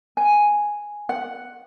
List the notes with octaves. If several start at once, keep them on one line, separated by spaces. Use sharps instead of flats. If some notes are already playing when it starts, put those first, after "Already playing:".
G#5
F#5